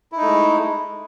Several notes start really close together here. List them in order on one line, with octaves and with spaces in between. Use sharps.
E4 D#4 A3 G#3